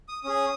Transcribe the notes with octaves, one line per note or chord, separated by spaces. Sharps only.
D#6
C#4 G#4 D#6